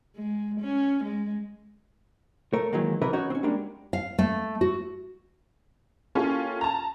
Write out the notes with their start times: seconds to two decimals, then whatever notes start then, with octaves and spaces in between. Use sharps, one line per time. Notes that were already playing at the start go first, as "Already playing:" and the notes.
0.17 G#3
0.61 C#4
1.05 G#3
2.53 A3 A#4 C#5
2.73 D#3 E3 F#3 G#3 A#3
3.02 C#2 E3 D#4 A#4 B4 E5
3.13 C#4 D#4 F#4 C#5
3.30 C4 C#4
3.43 G3 G#3 A#3 D4
3.93 F5
4.19 A3
4.61 F#4
6.15 A#3 C#4 E4 F4 G4 A4
6.61 A5 A#5